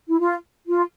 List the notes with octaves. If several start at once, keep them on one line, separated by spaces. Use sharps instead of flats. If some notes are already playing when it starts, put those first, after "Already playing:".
E4
F4
F4